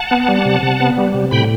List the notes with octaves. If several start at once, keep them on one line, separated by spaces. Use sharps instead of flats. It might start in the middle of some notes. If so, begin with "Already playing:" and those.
Already playing: F#5 A5
B3
G3
C3
C3
B3
G3
C3
A2 G5 B5